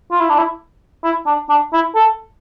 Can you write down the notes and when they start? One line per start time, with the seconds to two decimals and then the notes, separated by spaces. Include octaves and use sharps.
0.12 F4
0.21 E4
0.29 D4
0.38 E4
1.04 E4
1.27 D4
1.50 D4
1.73 E4
1.95 A4